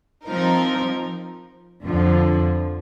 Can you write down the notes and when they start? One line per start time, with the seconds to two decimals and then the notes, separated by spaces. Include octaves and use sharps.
0.25 F3 C4 D#4 A#4
1.83 F2 D3 F3